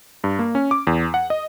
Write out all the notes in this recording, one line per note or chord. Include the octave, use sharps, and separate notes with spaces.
G2
A#3
C#4
D6
E2
F#5
D#5